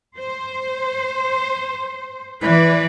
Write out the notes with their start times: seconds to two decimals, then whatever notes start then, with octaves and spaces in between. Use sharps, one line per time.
0.16 C5
2.42 E3 B4 D5